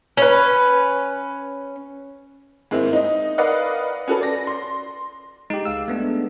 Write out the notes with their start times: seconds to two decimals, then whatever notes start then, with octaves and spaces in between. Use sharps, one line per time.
0.17 C#4 B4
2.71 G#2 D#3 G#3 A#3 C4 E4
2.93 D#4 D#5
3.38 A#4 B4 D5 D#5 F5 F#5
4.08 C#4 F#4 A4 B4
4.21 D5 A#6
4.47 C6
5.50 G#3 D#4 G4
5.65 C#2 F5 E6
5.88 G#3 A3 B3 D4